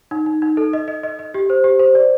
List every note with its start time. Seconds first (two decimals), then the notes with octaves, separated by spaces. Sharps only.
0.11 D#4
0.26 D#4
0.42 D#4
0.57 A4
0.73 D#5
0.88 D#5
1.03 D#5
1.19 D#5
1.34 G4
1.50 C5
1.64 G4
1.79 C5
1.95 D5